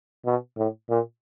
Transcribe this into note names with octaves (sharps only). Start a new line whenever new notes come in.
B2
A2
A#2